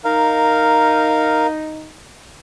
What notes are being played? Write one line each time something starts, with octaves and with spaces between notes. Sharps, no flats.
D#4 A#4 F5